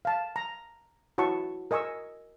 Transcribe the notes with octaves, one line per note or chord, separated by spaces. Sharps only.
F5 A5
A#5
E4 F#4 C#5 A5 C#6
A#4 D#5 G#5 C#6 E6